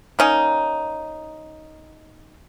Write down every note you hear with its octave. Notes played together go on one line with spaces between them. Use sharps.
A#3 C#4 D#4